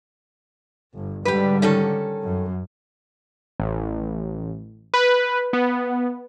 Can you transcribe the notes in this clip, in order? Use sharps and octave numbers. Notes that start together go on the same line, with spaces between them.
G1
G#2 D3 G3 G4 B4
D#3 C#4 A4
F#2
A1
B4
B3